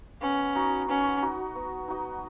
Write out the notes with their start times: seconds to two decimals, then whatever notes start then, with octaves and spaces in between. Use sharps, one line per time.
0.22 B3 C#4
0.55 D#4 F#4 D#5
0.89 B3 C#4
1.22 D#4 F#4 D#5
1.55 B3
1.88 D#4 F#4 D#5